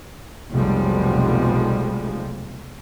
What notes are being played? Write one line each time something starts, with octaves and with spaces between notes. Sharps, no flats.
F1 B1 B2 F3 G3 G#3